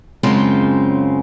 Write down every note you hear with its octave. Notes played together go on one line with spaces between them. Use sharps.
F#2 C#3 G#3 C4 F4 A5